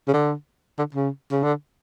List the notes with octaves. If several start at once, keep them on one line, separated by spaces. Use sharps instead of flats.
C#3
D3
D3
C#3
C#3
D3